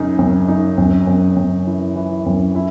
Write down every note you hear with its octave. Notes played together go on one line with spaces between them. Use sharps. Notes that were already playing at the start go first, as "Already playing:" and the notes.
Already playing: F#2 C#3 D#4
F#2
D#4
F#2
F#2
F#2
E3
E3
F#2
E4